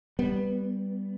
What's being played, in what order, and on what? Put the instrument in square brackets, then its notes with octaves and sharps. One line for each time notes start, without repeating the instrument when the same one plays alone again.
[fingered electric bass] G3 [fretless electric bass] B3